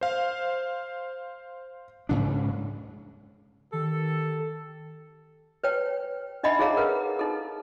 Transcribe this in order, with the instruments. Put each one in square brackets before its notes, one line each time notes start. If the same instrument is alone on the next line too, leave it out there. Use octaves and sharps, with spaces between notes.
[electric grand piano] C5 F5
[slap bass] G#2 C#3 D4
[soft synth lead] D#3 [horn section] G4 A4
[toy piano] B4 C#5 G5
D4 D#4 D#5 E5 F#5 B5
D#4 G#4 A4 C#5 F5 A#5
A#4 B4 F#5
D#4 A4